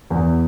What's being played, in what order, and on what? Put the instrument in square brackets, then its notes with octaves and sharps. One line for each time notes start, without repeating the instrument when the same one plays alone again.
[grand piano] E2